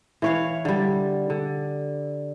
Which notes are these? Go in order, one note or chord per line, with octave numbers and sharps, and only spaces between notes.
E3 C#5 F5
D3 G3
D3